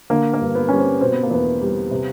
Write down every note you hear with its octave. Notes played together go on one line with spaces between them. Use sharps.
D3 A#3
A#3
G2
B3
G3 C#4
C4
B2 C4
B3
A#3
E2 B3
G3
C3